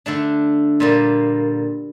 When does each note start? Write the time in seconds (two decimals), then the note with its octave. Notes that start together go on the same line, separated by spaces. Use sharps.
0.06 D3 A3 D4
0.80 A#2 G3 A#3